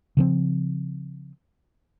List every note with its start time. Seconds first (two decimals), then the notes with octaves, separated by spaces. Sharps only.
0.17 C#3 F3 C4